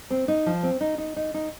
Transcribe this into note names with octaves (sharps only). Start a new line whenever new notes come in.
C4
D#4
F3
C4
D#4
D#4
D#4
D#4